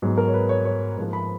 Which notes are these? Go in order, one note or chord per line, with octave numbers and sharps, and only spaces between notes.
G#2 F#3 B3
A#4
C#5
B4
C#5
C#5
G#2 F3 A#3
B5